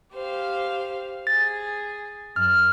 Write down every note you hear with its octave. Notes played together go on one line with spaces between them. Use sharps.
G4 C5 F5
G#4 A6
F#2 F6